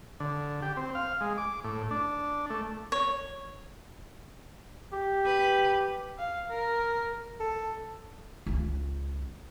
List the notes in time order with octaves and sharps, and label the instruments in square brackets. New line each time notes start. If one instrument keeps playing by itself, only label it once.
[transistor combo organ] D3
G4
C4
F5
G#3
D6
A2
D4
A3
[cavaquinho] C#5
[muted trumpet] G4
[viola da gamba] B4
[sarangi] F5
A#4
[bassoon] A4
[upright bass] C#2 C#3